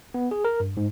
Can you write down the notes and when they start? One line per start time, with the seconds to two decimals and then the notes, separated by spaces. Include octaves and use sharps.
0.14 B3
0.31 G#4
0.45 A#4
0.60 G2
0.77 G#2